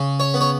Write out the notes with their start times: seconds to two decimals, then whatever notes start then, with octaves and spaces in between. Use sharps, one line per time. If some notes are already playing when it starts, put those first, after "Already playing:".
Already playing: C#3
0.20 C#5
0.34 B3
0.41 C#5